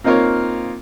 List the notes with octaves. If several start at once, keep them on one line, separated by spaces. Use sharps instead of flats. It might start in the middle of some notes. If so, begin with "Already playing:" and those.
A#3 C4 D#4 F4 A#4 C#5